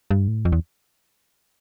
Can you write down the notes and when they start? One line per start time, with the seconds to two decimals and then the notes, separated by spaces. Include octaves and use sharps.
0.11 G2
0.28 A2
0.45 F2
0.52 E2